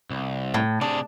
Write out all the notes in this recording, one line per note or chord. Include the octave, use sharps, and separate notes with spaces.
C2
A2
C3 D4 G#4